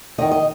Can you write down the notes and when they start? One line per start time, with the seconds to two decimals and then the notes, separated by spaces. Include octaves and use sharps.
0.18 E2 D#3 D#5
0.31 D#5